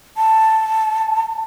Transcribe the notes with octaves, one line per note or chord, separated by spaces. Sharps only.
A5